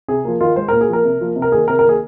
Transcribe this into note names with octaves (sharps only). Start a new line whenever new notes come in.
C3 G#4
F3 A#3
D#3 F4
G#3 C5
A#2 A#4
G#4
F3 A#3 A#4
C3
F3 A#3
C3
A#4
D#3 A#3 G#4
C3 A#4
A#4
D#3 A#3 G#4